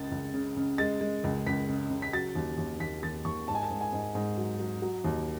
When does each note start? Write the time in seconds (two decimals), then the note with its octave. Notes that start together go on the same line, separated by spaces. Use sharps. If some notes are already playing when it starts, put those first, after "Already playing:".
Already playing: C#2 C#3 G#3 A6
0.11 C#2
0.34 C#3
0.57 C#3
0.78 G#3 A6
1.01 G#3
1.24 C#2
1.46 C#2 B6
1.69 C#3
1.90 C#3
2.02 B6
2.13 F#3 A6
2.35 D#2
2.58 D#2
2.80 D#2 B6
3.03 D#2 A6
3.25 D#2 C#6
3.48 G#2 A5
3.55 G#5
3.63 A5
3.70 G#2
3.81 G#5
3.93 G#2
4.15 G#2
4.38 F#3
4.60 F#3
4.82 F#3
5.04 D#2